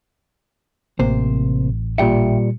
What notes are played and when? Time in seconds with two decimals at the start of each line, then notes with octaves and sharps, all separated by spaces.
0.99 A1 C3 A#3 C5
1.98 A#2 G3 E5 G5 C#7